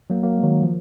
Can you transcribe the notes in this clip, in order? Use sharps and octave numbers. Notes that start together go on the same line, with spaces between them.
F#3 A#3
F#3 A#3
G#3
D#3 F#3
F3